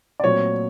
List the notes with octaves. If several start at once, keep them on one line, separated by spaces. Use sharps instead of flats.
D5
A#2 F#3 A3 C4 C#5